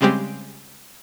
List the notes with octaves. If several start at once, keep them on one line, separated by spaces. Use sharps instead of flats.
C#3 G3 G#3 C4 G4